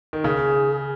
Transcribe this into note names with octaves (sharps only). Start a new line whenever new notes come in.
D#3
C#3 G#4